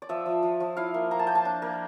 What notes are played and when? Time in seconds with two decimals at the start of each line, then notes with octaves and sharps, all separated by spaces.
0.02 D5
0.09 F3 E5
0.26 F3
0.43 F3
0.60 F3
0.77 E4 F5
0.94 A#3
1.11 A#3 A#5
1.19 A5
1.27 A#3 G5
1.35 A5
1.45 D4
1.62 A#3